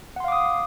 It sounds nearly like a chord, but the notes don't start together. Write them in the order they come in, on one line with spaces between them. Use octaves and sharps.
F#5 C6 F5 D6 D#6